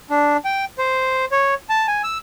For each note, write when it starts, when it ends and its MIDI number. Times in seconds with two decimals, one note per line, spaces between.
0.10 0.37 62
0.45 0.65 79
0.78 1.25 72
1.31 1.54 73
1.69 1.87 81
1.88 2.02 80
2.04 2.18 88